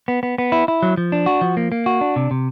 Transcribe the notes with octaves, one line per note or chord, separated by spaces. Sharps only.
B3
B3
B3
E4
E4
F#3
F3
D4
F#4
F3
A#3
A#3
F#4
D4
C3
C3